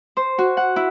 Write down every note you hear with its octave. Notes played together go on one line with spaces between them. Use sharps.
C5
F#4
F#5
E4